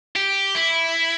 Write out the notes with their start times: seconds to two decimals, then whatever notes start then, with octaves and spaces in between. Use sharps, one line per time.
0.16 G4
0.55 E4